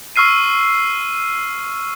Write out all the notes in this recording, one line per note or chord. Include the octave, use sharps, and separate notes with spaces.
C#6 E6 F6 C7 D#7